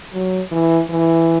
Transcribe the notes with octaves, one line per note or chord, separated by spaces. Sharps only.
F#3
E3
E3